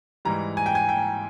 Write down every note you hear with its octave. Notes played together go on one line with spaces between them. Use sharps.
G#2 E3 G3 A#5
G#5
G5
G#5
G5